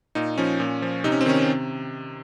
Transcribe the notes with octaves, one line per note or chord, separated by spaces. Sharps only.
A#2 D#4
F3 C#4
A#2
F3
C3 D#4
C#4
C4
D#3 C#4
C3